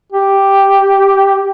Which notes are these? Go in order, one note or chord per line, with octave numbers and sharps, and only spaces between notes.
G4